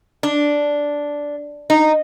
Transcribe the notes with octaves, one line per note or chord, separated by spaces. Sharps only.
D4
D#4